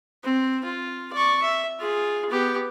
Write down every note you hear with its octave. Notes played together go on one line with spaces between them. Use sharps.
C4
F4
D5 C#6
E5
F4 G#4
B3 G4